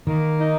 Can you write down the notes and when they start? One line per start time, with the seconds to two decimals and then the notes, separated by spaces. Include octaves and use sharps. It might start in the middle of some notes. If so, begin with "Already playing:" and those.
0.06 D#3 A#3
0.40 D#4